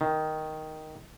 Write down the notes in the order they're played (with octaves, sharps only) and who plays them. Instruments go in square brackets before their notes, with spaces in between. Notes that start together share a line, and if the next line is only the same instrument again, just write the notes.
[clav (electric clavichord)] D#3